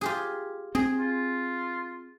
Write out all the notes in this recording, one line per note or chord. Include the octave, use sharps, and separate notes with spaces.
F4 G4 G#4
C4 G#4
F4